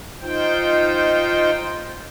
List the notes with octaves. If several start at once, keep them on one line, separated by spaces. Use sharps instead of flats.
D#4 F4 C5 G5